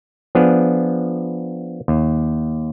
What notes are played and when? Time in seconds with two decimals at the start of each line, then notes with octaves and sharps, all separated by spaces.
0.35 F3 B3 D4 G#4
1.88 D#2